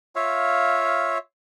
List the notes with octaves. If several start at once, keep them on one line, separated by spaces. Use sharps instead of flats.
F4 C#5 E5 F5